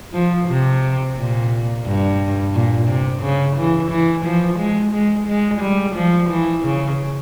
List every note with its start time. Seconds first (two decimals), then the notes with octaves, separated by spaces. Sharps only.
0.13 F3
0.48 C3
1.17 A#2
1.85 G2
2.54 A#2
2.88 C3
3.22 C#3
3.56 E3
3.90 E3
4.25 F3
4.59 G#3
4.92 G#3
5.27 G#3
5.61 G3
5.95 F3
6.29 E3
6.64 C#3